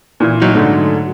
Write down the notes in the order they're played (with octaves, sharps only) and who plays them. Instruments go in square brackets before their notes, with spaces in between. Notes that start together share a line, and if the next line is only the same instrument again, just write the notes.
[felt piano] A#2 E3
[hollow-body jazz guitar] F#3 D#4
[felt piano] G#2 D3 A3